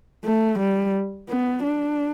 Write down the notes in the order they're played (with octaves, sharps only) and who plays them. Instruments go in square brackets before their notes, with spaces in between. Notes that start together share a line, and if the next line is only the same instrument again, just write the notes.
[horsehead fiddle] A3
G3
B3
D4